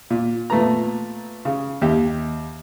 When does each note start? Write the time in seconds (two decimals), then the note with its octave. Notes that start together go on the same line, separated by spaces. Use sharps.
0.10 A#2
0.50 A#2 A3 B3 A#5
1.45 C#3
1.81 D#2 G4 E5